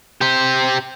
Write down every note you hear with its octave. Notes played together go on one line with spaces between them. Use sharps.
G4 C5